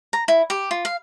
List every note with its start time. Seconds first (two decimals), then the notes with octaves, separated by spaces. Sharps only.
0.13 A#5
0.28 E4
0.50 G4
0.71 F4
0.85 F5